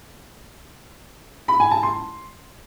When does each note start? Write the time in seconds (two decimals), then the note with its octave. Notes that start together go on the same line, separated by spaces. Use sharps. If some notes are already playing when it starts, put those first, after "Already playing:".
1.48 B5
1.60 G#5
1.71 A5
1.83 C6